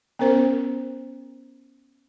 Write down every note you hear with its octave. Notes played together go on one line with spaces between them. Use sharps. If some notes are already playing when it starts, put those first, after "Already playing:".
B3 C#4 A#4 C5